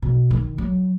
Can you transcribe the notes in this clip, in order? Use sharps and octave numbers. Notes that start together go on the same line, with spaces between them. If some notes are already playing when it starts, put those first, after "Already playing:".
B2
D#3
F#3